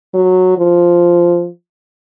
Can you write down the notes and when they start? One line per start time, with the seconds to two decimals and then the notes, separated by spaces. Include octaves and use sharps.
0.14 F#3
0.58 F3